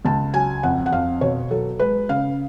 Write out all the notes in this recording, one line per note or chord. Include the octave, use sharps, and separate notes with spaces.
C#2 A5
F#3 G#5
F2 F#5
F#5
F2 F5
B2 C#5
F#3 A4
G#3 B4
C#3 F5